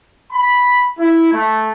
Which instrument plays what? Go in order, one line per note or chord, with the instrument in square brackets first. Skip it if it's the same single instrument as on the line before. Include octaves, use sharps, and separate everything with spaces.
[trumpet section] B5
E4
A3